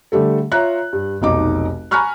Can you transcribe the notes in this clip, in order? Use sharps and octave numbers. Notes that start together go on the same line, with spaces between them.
D3 G3 A3 A4
F4 C#5 E5 A#5 F#6
G2
F1 B1 D#4 D6
G#5 A#5 B5 C#6 F6 F#6